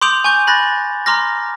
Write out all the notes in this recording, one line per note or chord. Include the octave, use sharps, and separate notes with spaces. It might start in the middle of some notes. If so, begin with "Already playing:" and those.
C6 D6 D#6 G6 D7 F7
G#5 C#6 G6
B5 F#6 A6 A#6
A#5 C6 D6 F6 A#6